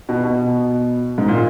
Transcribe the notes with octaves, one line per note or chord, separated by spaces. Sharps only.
B2
B2
G#2
A#2